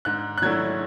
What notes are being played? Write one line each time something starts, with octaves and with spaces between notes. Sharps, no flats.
G#2 F#6
F#6
F#3 A3 E4 G#6